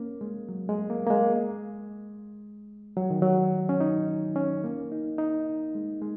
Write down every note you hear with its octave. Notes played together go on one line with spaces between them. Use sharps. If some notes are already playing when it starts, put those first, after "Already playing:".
Already playing: A#3 C#4
G#3
F#3
G#3
A#3
A#3
G#3
F#3
D#3
F#3
C#4
D#4
C#4
A#3
D#4
D#4
G#3
G#3